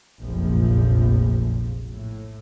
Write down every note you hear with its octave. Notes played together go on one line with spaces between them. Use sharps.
F1 A#1 F#2 A#2 F3
A2